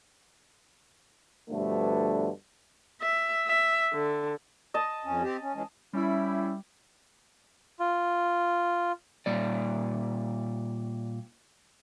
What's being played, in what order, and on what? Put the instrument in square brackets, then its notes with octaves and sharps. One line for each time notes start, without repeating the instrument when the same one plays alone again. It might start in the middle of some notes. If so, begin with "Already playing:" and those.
[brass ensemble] G2 B2 D3 F3 A3
[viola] E5
E5
D3
[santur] D#5 A5
[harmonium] F2 C#4
C4 G4
C#4
E3 G#3 C#4
[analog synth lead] G3 [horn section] C#4 E4
[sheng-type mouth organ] F4
[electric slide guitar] A#2 G3 D5